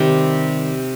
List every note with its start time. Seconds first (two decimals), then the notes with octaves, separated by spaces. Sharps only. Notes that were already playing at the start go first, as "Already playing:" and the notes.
Already playing: C3 D#3 G3 G4